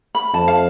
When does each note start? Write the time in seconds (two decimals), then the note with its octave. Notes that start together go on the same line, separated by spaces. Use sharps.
0.15 B5
0.34 F2 A5
0.48 F5